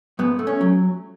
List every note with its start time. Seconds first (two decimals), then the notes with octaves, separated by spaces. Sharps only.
0.19 G#2 B3
0.39 A3
0.47 C#4
0.61 F#3